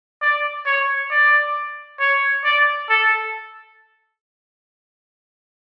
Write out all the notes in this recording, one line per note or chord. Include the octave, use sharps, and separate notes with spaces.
D5
C#5
D5
C#5
D5
A4